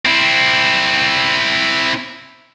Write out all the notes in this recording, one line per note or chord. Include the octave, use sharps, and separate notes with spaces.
C4 E4